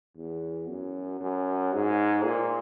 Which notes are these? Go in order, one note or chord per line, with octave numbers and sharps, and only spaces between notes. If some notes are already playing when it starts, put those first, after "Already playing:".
E2
F#2
F#2
G#2
A#2